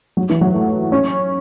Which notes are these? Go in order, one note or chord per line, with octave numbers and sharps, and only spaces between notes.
F#3
E3
F#3
A3
C#4